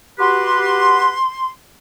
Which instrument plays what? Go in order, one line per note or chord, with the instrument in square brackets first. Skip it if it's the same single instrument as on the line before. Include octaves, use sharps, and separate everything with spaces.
[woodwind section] F#4 G4 B4 [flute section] C6